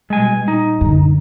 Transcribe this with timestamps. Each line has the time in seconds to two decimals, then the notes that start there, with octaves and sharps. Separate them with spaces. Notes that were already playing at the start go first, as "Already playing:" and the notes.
0.10 B2 G3 G#3 G#5
0.48 A#2 D#4
0.81 F#2 D3